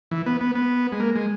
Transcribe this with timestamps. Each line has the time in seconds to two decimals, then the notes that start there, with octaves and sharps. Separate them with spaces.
0.11 E3
0.26 B3
0.41 B3
0.55 B3
0.92 G#3
1.00 A#3
1.16 G#3